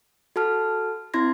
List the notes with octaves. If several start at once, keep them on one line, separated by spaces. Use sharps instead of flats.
F#4 A4 A5 F6
C4 E4 C6 G#6 A#6